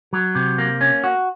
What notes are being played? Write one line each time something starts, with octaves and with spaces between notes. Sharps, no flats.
F#3
C3
A#3
C#4
F#4